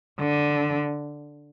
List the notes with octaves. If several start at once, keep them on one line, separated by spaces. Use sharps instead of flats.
D3